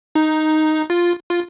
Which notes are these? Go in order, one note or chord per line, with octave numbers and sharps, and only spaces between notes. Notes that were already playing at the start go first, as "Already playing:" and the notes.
D#4
F4
F4